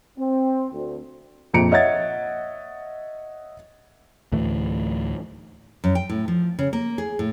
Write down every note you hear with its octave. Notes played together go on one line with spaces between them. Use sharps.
C4
D2
A#1 F2 A#5 C#7 D7
C#5 D#5 E5 F#5 G#6 A6
D2 A2 E3 A3
F#2
G5
A2
F3
C#3
A#3
G#4
A2